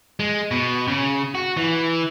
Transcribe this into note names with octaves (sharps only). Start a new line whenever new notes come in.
G#3
B2
C#3
F#4
E3